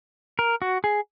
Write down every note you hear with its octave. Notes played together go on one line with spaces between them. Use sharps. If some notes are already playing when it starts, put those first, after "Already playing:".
A#4
F#4
G#4